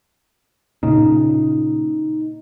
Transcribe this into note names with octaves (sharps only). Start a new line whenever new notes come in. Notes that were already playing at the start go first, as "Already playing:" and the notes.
A#2 C#3 D#4